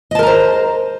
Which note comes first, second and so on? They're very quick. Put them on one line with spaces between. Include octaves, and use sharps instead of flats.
D#5 A5 A#4 A#5 C5